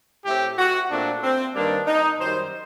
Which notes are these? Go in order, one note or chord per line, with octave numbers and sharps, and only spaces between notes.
A2 A3 C4 G4
F#4
A#2 A3 C4 D4
C4
G2 D#3 G3 A#3 D4
D#4
F#2 D#3 G3 C5